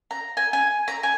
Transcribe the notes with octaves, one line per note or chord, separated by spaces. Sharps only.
A#5
G#5
G#5
A#5
G#5